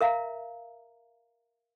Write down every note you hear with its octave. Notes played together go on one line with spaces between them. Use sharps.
A#4 E5 F5 A#5